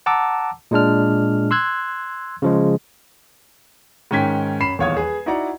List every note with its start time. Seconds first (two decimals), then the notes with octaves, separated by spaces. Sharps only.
0.06 F#5 A5 A#5 D6 E6
0.71 A#2 G#3 D4 F6
1.51 C6 E6 F#6 G#6
2.42 C#3 F3 G#3
4.11 G#2 D#3 C#4 G5 G#6 B6
4.60 F#2 B5 C7 E7
4.79 D#1 E2 C#5 F5 D#6 G#6
4.97 G#4 B4
5.26 D#4 E4 F#4 D5 F#5 A#5